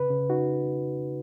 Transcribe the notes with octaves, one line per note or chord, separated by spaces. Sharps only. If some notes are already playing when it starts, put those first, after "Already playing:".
Already playing: C#3 B4
C#3
D#4 F#4